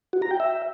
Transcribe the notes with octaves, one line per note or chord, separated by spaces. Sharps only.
F#4
A#5
G5
E5